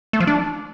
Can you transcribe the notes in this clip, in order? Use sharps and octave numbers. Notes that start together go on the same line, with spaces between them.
A3
F3
D4